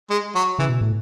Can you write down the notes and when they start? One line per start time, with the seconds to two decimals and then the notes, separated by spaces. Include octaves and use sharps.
0.10 G#3
0.35 F#3
0.59 C#3 E3
0.69 B2
0.81 A2